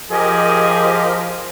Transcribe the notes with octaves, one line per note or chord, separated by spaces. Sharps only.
F3 G4 G#4 A#4 D#5